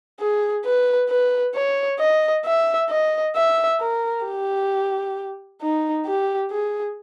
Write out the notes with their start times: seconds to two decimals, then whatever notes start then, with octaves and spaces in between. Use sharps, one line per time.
0.20 G#4
0.65 B4
1.09 B4
1.55 C#5
2.00 D#5
2.46 E5
2.90 D#5
3.36 E5
3.80 A#4
4.26 G4
5.62 D#4
6.06 G4
6.51 G#4